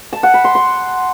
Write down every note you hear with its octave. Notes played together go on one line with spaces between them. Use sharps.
A5
F#5
B5
C6
C6